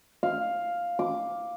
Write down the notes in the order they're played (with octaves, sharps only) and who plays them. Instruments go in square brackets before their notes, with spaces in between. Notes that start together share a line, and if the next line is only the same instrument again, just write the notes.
[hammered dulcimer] F5
D6